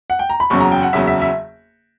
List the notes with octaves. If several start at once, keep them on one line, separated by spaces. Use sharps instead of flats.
F#5
G5
A#5
B5
F#1 E2 C#3 F#3 C#6
A#5
G5
F#5
F#1 E2 C#3 F#3 E5
E5
E5